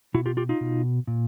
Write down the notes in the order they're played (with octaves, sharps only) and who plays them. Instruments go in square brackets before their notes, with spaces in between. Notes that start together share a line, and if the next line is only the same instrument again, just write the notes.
[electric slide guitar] B2 E4 F#4
F4 G4
F4 G4
D#4 F4
B2
A#2